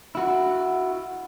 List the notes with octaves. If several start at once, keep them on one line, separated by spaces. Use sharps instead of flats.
E4 F#4